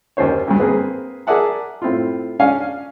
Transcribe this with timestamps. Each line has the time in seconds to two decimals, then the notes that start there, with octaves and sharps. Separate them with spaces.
0.17 D#2 C#4 C5 C#5
0.48 D2 G2
0.59 A#3 C4 G#4 B4
1.27 G#4 A#4 D5 E5 F#5 A5
1.82 A2 C4 E4 F4
2.40 C#4 D4 F5 G#5